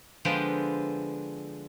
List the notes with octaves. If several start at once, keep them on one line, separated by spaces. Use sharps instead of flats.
D3 F3 G#3 B3 F4 G5